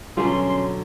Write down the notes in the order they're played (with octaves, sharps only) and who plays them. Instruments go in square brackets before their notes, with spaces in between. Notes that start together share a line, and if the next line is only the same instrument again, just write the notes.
[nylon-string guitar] B2 D3 F#3 [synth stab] G3 F4 G#4 [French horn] C#4 [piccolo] C6